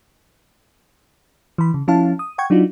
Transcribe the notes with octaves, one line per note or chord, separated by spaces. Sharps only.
E3 B5
C#3
F3 C#4 E4 F5 A5
D#6
F#5 G5 C#6 G#6
F#3 D4 D#4 F4 F#4